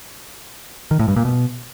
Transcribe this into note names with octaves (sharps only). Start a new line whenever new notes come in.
D#3
A2
G2
A#2
B2